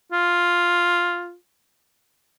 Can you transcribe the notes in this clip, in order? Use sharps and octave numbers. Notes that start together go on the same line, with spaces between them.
F4